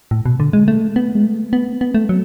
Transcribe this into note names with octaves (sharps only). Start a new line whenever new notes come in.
A2
B2
D3
G#3
A3
B3
G#3
A3
B3
B3
A3
F#3